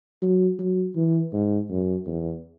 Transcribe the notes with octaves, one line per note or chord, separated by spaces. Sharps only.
F#3
F#3
E3
G#2
F#2
E2